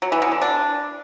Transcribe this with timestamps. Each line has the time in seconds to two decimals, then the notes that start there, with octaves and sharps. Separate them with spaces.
0.02 F#3
0.12 E3
0.22 B2
0.32 D3
0.42 D4